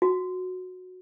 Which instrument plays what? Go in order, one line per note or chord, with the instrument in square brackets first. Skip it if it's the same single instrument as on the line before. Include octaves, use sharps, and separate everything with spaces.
[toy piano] F#4